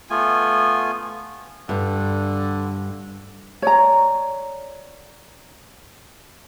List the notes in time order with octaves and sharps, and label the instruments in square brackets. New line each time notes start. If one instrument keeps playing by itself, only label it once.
[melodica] A3 B3 F4 G#5
[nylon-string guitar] G2 [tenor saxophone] D3
[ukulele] C#5 D5 A#5